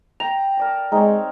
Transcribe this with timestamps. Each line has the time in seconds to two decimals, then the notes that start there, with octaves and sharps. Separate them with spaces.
0.20 G5 A#5 F7
0.57 A#4 D5 A5
0.92 G#3 C4 D#4 C#5 A#5